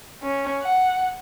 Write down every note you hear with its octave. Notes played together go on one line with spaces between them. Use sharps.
C#4
F#5